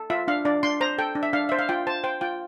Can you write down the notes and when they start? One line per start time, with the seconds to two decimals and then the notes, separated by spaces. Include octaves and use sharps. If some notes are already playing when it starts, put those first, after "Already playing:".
Already playing: A4
0.10 F4 E5
0.28 D4 F5
0.45 D4 D5
0.63 D4 C6
0.81 C5 A#5
0.98 A4 G5
1.15 D4
1.23 E5
1.33 D4 F5
1.49 C5 E5
1.59 F5
1.69 F4 G5
1.87 C5 A5
2.04 C5 G5
2.21 F4 G5